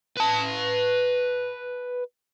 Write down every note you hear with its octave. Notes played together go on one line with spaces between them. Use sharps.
B4 A5